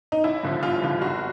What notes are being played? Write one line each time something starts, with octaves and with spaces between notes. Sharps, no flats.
D#4
A1 E4
G2 D3 F3
A1 F4
G2 D3 F3
F#1 F#4